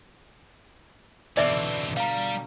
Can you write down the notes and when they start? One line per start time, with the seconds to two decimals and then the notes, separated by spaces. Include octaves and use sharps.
1.37 B2 D3 E3 C4 D4 D5 E5 D6
1.97 G3 F5 A#5